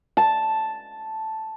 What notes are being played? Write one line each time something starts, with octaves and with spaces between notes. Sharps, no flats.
A5